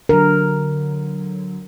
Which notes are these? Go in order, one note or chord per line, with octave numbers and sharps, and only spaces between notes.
D3 F#3 A#4